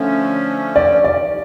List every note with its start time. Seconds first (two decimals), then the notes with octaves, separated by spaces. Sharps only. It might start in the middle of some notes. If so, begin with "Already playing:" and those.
Already playing: D3 F3 A3 C#4
0.76 D5
1.04 D5